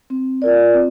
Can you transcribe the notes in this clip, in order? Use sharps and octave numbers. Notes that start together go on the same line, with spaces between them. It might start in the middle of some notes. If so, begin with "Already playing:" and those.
C4
F4 A#4 D5
C4